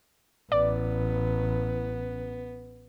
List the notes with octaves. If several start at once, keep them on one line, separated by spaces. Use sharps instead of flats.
A1 B3 D5